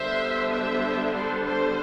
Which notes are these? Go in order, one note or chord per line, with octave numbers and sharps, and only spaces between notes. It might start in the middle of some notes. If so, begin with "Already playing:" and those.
Already playing: D3 G3 B3 D4 C5 E5
C5 E5
A4 C5
A4 C5